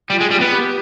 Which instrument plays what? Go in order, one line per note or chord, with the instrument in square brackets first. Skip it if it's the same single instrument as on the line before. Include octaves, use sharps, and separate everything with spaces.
[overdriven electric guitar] G3 [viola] F4
[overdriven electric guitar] G#3
G3
B3
[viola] G4